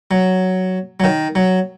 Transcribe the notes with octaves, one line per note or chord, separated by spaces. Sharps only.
F#3
F#3
D#3
F#3